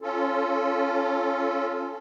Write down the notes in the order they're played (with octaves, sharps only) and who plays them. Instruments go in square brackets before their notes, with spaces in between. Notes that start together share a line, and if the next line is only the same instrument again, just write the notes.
[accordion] C#4 F4 A4